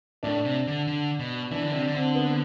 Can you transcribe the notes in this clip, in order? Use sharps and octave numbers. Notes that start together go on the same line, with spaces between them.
A2 D4
C3
D3
D3
B2
E3 D4
D3
C3 D4
D3
C4
B3